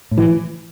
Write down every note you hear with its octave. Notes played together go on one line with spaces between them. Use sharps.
A2
E3